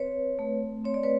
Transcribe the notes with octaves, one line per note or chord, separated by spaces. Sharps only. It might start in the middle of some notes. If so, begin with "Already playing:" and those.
Already playing: C4 B4 C#5
A3
C4 C#5
D5
B4 C#5